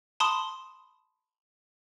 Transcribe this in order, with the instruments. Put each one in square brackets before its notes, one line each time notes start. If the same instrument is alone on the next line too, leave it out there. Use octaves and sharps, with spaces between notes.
[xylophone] A5 B5 C6 D#6